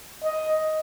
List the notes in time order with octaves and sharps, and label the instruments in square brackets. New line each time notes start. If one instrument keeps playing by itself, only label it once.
[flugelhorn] D#5